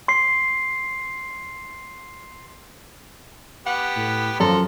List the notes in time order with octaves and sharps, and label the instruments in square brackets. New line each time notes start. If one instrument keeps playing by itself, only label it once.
[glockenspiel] C6 C7
[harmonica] B3 G4 [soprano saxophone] F#5
[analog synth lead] A2
[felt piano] F#2 [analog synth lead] F3 [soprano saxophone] A4 [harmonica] A#4 C6